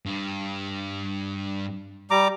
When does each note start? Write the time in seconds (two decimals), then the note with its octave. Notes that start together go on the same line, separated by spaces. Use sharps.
0.06 G2
2.11 G3 A#5 D6